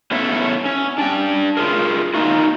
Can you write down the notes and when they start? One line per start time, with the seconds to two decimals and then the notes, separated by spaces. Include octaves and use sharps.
0.11 B3 C#4 E4 A4 C#5 E5
0.66 C#4
0.98 D4 G5
1.57 F4 G#4 A#4
2.14 A#3 D#4 F4 F#4